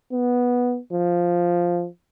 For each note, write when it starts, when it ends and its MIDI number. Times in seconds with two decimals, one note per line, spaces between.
0.13 0.79 59
0.93 1.87 53